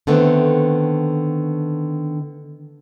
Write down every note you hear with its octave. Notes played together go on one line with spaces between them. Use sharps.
D3 D#3 A3 B3 C4